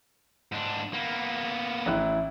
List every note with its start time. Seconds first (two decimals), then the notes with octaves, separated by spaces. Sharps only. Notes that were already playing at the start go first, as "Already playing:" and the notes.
0.52 G#2 D4
0.93 A#3 B3
1.86 A1 E4 F#6